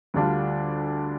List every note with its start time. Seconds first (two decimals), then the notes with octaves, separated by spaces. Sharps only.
0.14 D2 D3 G3 D4 F4